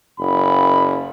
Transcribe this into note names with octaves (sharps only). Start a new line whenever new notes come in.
F#1 B5